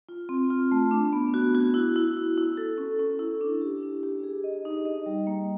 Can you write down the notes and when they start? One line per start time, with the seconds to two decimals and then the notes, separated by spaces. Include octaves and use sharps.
0.09 F4
0.29 C4
0.50 F4
0.72 A3
0.91 D4
1.13 B3
1.34 F#4
1.55 F#4
1.74 E4
1.96 E4
2.17 E4
2.37 E4
2.57 A4
2.78 C#4
2.99 C#4
3.19 E4
3.41 D4
3.61 G4
3.83 D4
4.03 G4
4.24 G#4
4.44 D#5
4.65 D#4
4.85 D#5
5.06 G3
5.27 A#3